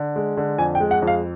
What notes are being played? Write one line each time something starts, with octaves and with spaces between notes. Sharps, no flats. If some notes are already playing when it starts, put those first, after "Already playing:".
Already playing: D3
G#3
D3
F2 G#5
G5
G#3
F#5
F2
F5